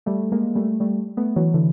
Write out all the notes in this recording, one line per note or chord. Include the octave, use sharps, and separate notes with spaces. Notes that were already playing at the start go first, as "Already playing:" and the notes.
G3 A3
G#3 A#3
G3 A3
G3 A3
A3 B3
E3 F#3
D3 E3